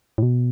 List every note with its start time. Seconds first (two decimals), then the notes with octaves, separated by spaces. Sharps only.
0.18 A2
0.23 B2